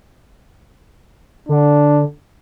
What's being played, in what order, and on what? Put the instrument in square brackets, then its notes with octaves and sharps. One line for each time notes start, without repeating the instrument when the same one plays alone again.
[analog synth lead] D3 [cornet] D4